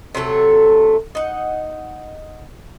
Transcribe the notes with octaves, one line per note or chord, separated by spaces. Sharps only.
C3 F#3 A3 A4
D#4 F#5